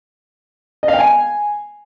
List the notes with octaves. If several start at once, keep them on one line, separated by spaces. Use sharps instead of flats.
D#5
F5
G5
G#5